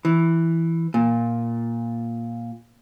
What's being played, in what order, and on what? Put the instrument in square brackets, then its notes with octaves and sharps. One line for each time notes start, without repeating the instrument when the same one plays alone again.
[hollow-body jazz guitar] E3
A#2